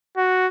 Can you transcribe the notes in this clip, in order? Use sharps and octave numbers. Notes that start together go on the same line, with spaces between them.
F#4